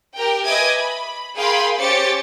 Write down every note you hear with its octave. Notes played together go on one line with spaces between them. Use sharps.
G4 A#4 G5
B4 D#5 E5 G#5 D6 G#6
B5
G#4 A#4 F5 G5 B5 C6
C#4 G4 C5 D6 A6 C#7